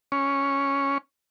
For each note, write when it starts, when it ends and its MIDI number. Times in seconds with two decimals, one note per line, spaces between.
0.12 0.98 61